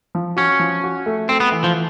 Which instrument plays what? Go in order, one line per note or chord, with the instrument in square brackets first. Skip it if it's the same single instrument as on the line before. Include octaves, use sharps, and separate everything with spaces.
[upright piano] F3
[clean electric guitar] C#4 [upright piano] F#4
[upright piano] F3
F#4
A3
[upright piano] A3 [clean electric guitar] C4
[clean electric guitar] B3
[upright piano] E3
[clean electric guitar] F3